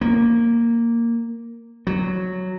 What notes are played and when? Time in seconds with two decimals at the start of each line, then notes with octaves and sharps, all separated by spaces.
0.01 A#3
1.87 F#3